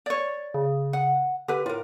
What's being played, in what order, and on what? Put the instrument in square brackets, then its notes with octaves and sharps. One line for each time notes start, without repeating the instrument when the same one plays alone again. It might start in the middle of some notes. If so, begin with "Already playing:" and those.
[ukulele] C#5 D5
[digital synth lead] C#3
[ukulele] F#5
[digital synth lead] D3 [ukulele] G4 B4
[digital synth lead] A2 [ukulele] F4 A#4